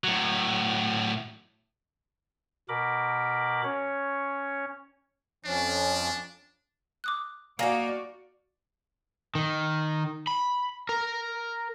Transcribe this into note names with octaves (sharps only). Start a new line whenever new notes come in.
A2 F#3
B2 A#4 B5 D6
C#4 C#5
F2 F3 C#4 D4
D6 D#6 F#6
A#3 D#4 F#4 D5 F5 G#5 A#6
D#3
B5
A#4